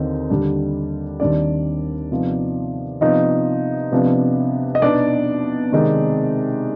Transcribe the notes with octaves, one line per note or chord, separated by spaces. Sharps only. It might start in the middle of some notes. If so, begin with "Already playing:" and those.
Already playing: D#2 D3 C4 D#4
D#2 D3 G3 D4
D#2 D#3 G3 C4 D4 D#4 D5
C3 F3 B3 D#4
C3 F3 B3 D#4 D#5
C3 F3 B3 D4
D#5
B2 B3 D4 D#4 D5
C3 D#3 G#3 C4 D#4